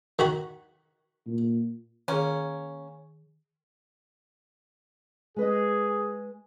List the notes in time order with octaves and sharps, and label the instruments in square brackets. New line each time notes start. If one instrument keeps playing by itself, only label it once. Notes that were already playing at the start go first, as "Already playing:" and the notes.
[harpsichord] D#3 F#4 B5
[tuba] A#2
[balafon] D#3 G#4 [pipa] A#3 C#4
[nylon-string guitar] G#3 B4 D#5 [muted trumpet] G#4